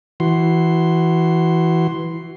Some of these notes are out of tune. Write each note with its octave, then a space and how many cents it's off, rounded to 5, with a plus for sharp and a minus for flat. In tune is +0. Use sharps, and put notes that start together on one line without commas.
E3 +0 F#4 +20 C6 +0